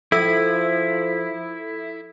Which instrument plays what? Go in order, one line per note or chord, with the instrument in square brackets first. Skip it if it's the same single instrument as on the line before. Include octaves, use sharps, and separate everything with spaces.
[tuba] F3 [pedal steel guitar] E4 [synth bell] A4 E5 E6